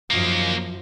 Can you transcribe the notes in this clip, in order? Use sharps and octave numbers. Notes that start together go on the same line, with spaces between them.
F#2 D#3 F3 A#3